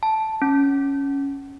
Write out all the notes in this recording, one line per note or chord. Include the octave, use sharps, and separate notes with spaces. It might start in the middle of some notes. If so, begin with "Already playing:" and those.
A5
C#4